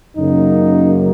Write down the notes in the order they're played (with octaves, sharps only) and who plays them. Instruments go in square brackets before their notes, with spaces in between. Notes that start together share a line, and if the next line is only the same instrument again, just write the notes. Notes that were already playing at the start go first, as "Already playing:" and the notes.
[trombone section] F#2 C#3 F#3 A#3 D#4